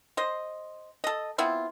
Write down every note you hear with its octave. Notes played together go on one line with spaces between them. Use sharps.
C5 D#5
A4 D#5
B3 C4 E4 F4